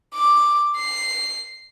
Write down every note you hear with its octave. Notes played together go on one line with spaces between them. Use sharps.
D6
C7